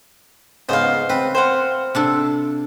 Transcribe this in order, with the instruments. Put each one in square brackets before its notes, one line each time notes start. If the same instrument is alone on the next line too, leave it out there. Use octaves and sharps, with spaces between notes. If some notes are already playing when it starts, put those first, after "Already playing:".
[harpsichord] G#2 C#3 B3 [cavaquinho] C5 F5
[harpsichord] C4 [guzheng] B4
[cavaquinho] C5 F5 F#5
[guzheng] C3 D4 A4